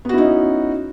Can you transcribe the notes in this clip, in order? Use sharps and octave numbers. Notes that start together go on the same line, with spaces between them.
B3 C#4 D#4 E4 F#4